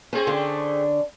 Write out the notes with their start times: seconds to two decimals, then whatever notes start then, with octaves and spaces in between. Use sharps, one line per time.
0.13 A3 C4 C#4 G#4
0.27 D3 C#4 D4